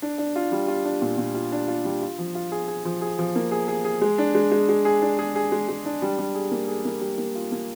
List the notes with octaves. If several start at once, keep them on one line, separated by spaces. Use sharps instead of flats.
D4
D4
F4
G3
F4
D4
A#2
A#2
F4
D4
F4
G3
F4
F3
F4
G#4
G#4
F3
G#4
F3
A#3
G#4
G#4
G#4
G#3
D4
G#3
G#3
G#3
G#4
D4
G#4
G#4
G#3
G#3
D4
G3
G3
G#4
A#3
G#4
A#3
G3
A#3
F4
A#3